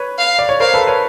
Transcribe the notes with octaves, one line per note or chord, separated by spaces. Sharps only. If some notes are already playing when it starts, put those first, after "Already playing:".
Already playing: B4 C#5
F5
D5
C#5
A#4 C5 F5
A4 B4
B4 C#5